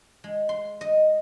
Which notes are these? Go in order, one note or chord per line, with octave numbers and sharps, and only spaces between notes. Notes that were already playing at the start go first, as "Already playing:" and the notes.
G#3
C6
D#5